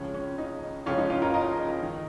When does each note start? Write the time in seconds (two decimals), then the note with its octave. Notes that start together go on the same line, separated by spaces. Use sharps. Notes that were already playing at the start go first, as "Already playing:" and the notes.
Already playing: C#2 C#3 F3 C#4
0.14 C#4
0.38 D#4
0.86 C#2 C#3 F3 C#4 F4
0.98 D#4
1.10 C#4 F4
1.22 F4 A#4
1.34 A#4 D#5
1.82 D#3